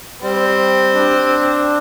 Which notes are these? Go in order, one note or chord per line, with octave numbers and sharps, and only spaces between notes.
G3 C4
D4